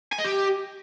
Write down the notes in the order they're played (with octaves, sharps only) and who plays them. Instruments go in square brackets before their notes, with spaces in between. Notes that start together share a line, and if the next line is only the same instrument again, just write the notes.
[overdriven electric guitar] G#5
D#5
G4